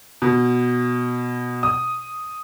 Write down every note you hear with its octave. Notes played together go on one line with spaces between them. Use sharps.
B2
D#6